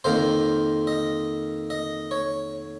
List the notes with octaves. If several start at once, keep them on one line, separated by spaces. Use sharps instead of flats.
F2 D#3 A#3 C5
D#5
D#5
C#5